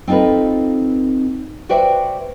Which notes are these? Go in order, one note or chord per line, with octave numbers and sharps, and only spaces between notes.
C4 D#4 F4 A4 B4
F#4 B4 C5 D5 E5 G5